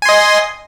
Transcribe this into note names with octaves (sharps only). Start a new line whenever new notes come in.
D#5 G#5 C6